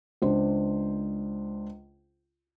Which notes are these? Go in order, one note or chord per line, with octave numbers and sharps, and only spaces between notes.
C#2 D4 C5